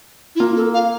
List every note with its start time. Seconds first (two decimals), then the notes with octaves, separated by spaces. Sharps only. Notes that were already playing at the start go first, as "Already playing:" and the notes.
0.36 E4
0.39 A#3 F4
0.56 A4
0.74 F5